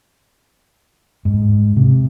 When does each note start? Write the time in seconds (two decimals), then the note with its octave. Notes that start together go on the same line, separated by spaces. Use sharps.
1.25 G#2
1.77 C3